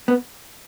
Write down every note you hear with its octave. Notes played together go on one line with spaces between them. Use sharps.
B3